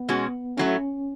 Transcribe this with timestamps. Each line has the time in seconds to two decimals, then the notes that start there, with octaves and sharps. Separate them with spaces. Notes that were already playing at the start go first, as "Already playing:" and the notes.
Already playing: B3
0.09 B2 G#3 C#4 F#4
0.57 A2 F#3 A3 C#4